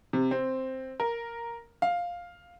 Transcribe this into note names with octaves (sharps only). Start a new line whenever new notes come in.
C3
C4
A#4
F5